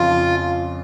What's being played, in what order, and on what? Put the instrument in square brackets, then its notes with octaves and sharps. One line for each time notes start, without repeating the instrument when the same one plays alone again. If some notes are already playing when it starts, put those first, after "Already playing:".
Already playing: [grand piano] F2 C#3 [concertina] F4
[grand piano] F3